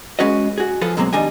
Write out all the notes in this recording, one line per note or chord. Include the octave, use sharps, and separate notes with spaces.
G#3 C#4 F#4 B4 D#5
F#4 G#4
F3 F4 G#4 A4 B4
B2 D3 F#3 G#3 A#3 C4
B1 D#3 G3 D4 D#5 G#5